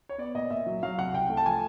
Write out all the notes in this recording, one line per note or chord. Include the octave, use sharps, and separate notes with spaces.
C#5
B3 D5
A#2 D#5
A#2 E5
F#3
F#3 F5
C2 F#5
C2 G5
A3
A5
F3 G#5